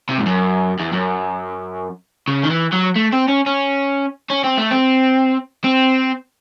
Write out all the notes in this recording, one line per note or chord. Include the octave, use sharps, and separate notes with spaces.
C3
G#2
F#2
E2
F#2
C#3
D#3
E3
F#3
A3
C4
C#4
C#4
C#4
C4
A3
C4
C4